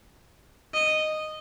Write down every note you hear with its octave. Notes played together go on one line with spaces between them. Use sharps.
D#5